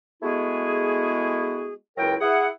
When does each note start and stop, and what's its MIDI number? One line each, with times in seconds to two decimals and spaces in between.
0.22 1.74 56
0.22 1.74 57
0.22 1.74 59
0.22 1.74 64
0.22 1.74 66
0.22 1.74 68
1.98 2.15 37
1.98 2.15 54
1.98 2.15 64
1.98 2.15 70
1.98 2.15 79
2.21 2.48 64
2.21 2.48 68
2.21 2.48 78